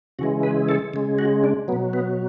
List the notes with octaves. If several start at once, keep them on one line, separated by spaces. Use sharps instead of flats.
C#3 E3 G#3 F#4
B4
A4
C#3 G#3
F#4
D4
B2 F#3 B3
B3